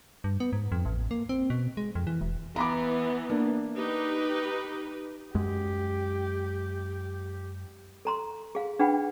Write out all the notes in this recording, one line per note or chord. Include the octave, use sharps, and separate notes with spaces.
G2
B3
G#2
F2
A1
A#3
C4
B2
G#3
F2
E3
E1
E3 B3 A#5 B5 D6
A#3 D4
D#4 G4 B4
F#2 G#3 G4
A4 A#5 C6
G#4 F5
D4 G#4 B4 F#5 G5 B5